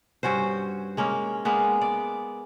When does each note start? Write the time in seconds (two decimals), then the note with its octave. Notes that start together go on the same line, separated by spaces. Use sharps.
0.23 G2 C#4 F#4 C5
0.97 G#3 A#3 C#4
1.45 G#3 A#3 B3
1.81 D5